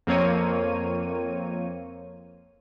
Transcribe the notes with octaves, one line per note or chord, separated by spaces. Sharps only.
F2 A#3 C4 C#5 D#7